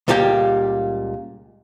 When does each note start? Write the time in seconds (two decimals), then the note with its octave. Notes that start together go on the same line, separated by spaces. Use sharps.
0.08 C#2 A#2 G3 A#3 G4 G5